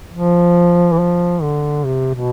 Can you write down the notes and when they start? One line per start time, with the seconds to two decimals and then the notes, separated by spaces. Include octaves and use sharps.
0.14 F3
0.92 E3
0.99 F3
1.42 D3
1.85 C3
2.15 B2